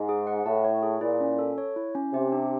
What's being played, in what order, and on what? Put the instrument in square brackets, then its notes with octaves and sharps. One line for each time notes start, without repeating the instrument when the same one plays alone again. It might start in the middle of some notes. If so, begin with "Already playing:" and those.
Already playing: [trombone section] G#2
[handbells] G#4
F#5
[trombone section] A2 [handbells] A5
[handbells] C#5
G#4
[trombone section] A#2 [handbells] E4
[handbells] C#4
A4
C#5
E4
C#4
[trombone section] C3 [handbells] G4
[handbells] D4